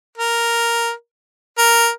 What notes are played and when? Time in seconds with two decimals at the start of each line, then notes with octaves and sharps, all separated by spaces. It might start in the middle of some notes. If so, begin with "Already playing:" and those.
0.18 A#4
1.58 A#4